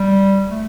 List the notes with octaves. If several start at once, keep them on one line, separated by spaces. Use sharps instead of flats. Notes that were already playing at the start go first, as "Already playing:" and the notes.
Already playing: G3
A3